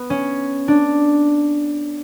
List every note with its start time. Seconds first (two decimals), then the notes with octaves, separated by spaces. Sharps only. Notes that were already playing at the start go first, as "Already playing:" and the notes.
Already playing: B3
0.10 C#4
0.68 D4